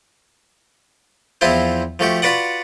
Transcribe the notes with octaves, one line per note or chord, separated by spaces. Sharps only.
E2 F3 C4 E4 F4 C5
F3 A3 F#4 G4
F4 F#4 B4 D5 F#5